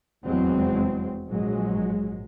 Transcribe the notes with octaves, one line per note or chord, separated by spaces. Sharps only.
F1 E2 F#3 G#3 C4
A#1 G#2 F#3 G#3